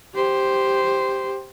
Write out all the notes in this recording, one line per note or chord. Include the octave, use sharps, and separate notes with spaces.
G4 C5